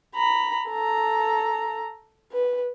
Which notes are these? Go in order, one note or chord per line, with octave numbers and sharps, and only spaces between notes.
A#5 B5
A4 A#5
B4